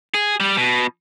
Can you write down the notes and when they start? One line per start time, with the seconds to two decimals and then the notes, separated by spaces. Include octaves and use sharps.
0.14 G#4
0.40 G3
0.57 B2